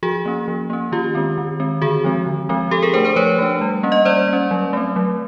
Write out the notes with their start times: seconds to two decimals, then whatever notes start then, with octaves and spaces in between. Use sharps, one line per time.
0.03 F3 F#4 G#4
0.25 A#3 C#4
0.48 F3
0.70 A#3 C#4
0.92 D#3 F4 G4
1.15 G#3 C4
1.38 D#3
1.60 G#3 C4
1.82 D3 F#4 G#4
2.04 F3 G#3 C4
2.26 D3
2.49 F3 G#3 C4
2.71 F3 G4 A4
2.82 G#4 A#4
2.94 D4 A#4 C5
2.97 A3
3.05 A#4 C5
3.16 F3 B4 C#5
3.38 A3 D4
3.61 G3
3.83 A#3 C#4
3.92 D#5
4.05 G3 C5 D5
4.28 A#3 C#4
4.51 F#3
4.73 A3 C4
4.96 F#3